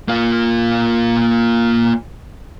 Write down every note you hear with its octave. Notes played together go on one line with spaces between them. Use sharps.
A#3 F4